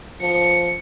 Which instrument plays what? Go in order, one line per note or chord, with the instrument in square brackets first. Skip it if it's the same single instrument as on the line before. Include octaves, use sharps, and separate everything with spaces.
[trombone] F3 [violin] C#7